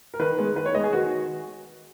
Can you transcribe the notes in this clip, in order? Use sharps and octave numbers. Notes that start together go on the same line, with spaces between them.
A#4
D#3 B4
G#3 B3
D#3 B4
C#5
G#3 B3 D#5
G#4
D#3 F#4